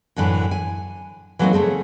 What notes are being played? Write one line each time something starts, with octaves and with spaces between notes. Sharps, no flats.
F#2 A2 D3 E3
G#5
E3 F#3 A3 A#3 C4 D#4
C#3 A3 C4 G#4